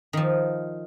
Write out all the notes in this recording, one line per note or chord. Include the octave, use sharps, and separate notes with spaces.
D#3 F3